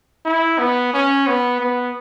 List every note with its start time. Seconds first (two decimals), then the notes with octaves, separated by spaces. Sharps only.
0.26 E4
0.59 B3
0.94 C#4
1.27 B3
1.60 B3